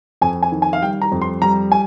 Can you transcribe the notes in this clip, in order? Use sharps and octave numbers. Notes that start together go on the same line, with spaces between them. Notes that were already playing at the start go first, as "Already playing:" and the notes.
F2 G#5
G#5
D#3
G#5
F5
G3 G5
A#5
F2
C6
G3 A#5
G#5